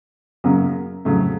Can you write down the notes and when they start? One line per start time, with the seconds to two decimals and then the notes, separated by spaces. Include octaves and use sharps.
0.44 F#2 C#3 F#3 A#3
1.05 F2 C#3 F#3 A3